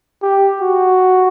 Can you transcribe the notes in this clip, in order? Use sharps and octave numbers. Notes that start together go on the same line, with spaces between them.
G4
F#4